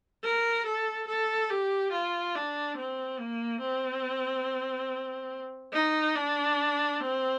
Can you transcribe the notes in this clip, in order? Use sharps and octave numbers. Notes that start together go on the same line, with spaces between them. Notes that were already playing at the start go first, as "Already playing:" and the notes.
A#4
A4
A4
G4
F4
D4
C4
A#3
C4
D#4
D4
C4